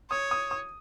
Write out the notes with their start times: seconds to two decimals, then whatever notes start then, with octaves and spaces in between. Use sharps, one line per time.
0.10 C#5 D#6
0.31 D#6
0.51 D#6